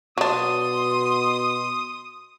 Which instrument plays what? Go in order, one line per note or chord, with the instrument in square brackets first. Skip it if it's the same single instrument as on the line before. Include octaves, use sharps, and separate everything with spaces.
[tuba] B2 [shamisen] F#3 D4 [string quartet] C6 [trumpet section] D#6